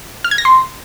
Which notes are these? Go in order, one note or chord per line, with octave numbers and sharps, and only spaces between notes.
F6
G#6
A#6
C6